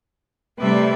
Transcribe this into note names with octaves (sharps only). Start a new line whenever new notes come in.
C3 G3 A3 B4 D5 E5